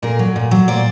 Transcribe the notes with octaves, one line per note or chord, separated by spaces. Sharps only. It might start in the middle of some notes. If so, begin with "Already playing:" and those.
A#2 G#4 A#4
F#3
A#2
F#3
A#2 C5 D5